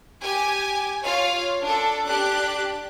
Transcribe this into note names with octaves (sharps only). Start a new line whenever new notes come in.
G4 G#5
F4 C#5 F5
D4 A4
D4 G4 F#6